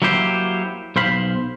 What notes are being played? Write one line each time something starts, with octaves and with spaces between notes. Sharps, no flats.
F#3 A#3 E4 G4 C5
B1 C5 F5 B5